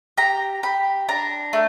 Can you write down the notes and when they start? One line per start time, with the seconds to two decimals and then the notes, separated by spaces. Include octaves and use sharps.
0.18 G4 A#5
0.63 G4 B5
1.09 D4 A#5
1.53 A3